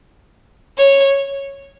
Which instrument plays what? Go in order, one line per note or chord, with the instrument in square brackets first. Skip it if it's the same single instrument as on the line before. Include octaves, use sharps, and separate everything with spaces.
[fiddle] C#5